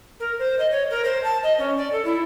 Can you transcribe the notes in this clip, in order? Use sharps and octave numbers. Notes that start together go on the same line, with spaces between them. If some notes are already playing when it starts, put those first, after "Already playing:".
A#4
C5
D#5
C#5
A#4
C5
A5
D#5
C#4
D5
A4
E4